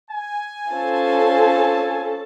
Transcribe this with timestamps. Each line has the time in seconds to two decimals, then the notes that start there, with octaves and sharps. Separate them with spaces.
0.11 G#5
0.72 C#4 F4 A4 C5 A5